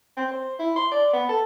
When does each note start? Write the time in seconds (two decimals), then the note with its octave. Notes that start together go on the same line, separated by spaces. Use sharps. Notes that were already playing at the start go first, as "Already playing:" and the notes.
0.17 C4
0.31 C5
0.59 E4
0.76 C6
0.92 D5
1.13 B3
1.29 A4